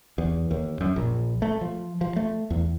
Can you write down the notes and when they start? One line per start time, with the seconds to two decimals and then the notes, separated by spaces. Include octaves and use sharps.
0.18 E2
0.51 D#2
0.81 F#2
0.96 A#1
1.42 A3
1.61 F3
2.01 F3
2.16 A3
2.50 E2